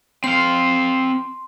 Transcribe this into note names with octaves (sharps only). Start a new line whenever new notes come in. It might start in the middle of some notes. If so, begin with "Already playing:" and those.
C4 F5 C6